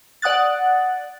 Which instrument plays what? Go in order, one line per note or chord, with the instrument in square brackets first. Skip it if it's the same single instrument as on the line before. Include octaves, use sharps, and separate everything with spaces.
[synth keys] D5 F#5 D#6 F#6 A6